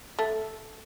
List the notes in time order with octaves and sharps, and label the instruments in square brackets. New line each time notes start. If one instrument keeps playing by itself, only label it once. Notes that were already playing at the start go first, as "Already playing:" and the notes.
[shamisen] A3